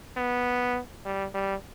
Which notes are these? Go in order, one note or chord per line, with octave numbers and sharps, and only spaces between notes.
B3
G3
G3